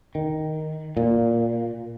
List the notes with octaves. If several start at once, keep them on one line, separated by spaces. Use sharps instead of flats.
D#3
A#2